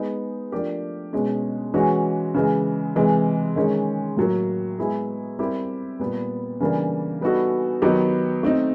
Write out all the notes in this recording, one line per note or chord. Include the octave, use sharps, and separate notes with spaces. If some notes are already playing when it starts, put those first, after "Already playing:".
Already playing: G#3 B3 D#4
F3 A3 D4 G4 A#4
B2 G#3 C#4
E3 G#3 C#4 F#4
C#3 E3 G#3
C3 E3 G#3
D#3 G#3 C#4
A2 F#3 A#3
G#3 B3 E4 G#4
G3 C4 E4 G4 A#4
A#2 G3 B3
C#3 E3 G3 A#3 D4
G3 B3 D#4 F#4 A4
D#3 F#3 B3 D#4 G4
A3 C4 D#4